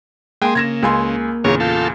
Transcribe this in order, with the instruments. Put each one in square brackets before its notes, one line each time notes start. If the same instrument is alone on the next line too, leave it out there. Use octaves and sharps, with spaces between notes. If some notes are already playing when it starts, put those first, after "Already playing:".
[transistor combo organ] G#3 G#4 [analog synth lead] A#3 [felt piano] G5 C6
[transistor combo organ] C#3 [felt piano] G#6 A#6 E7
[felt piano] C#2 G#5 C6
[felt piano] E2 A#2 C#3 [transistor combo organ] C#4 A#4 C#5
[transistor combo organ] F4 A4 [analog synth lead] G6